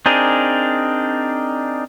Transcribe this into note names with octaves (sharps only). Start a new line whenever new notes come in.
C4 D4 D#4 G#4 A#4